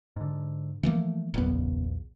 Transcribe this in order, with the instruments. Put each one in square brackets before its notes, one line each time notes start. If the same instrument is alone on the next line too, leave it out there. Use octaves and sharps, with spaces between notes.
[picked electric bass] G#2 D3
[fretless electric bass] E3 F3 A#3 [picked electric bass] A3
[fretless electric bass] F#1 B3 [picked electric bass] B1 E2 A#2